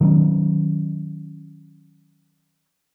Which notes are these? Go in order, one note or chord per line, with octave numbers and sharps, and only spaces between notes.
D#3 F#3 C#4